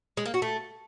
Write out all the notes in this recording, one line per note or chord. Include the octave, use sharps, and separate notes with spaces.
G#3
A#3
F#4
A3